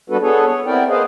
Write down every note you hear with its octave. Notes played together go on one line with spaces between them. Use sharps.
G3 B3 D4 F#4 A4 B4
B3 D4 G#4 A4 B4 C#5
C#5
B3 C4 E4 A#4 D5 G5
A#3 G#4 B4 C5 D#5 F5